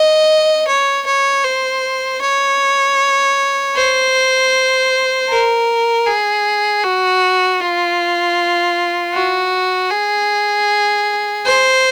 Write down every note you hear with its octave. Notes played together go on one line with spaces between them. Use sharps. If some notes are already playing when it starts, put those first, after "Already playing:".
Already playing: D#5
C#5
C#5
C5
C#5
C5
A#4
G#4
F#4
F4
F#4
G#4
C5